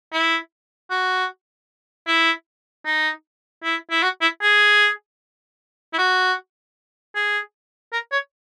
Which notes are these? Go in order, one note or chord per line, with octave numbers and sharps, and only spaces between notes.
E4
F#4
E4
D#4
E4
E4
F#4
E4
G#4
E4
F#4
G#4
A#4
C#5